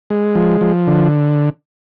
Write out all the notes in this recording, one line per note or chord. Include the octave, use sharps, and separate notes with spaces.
G#3
F3
F3
D3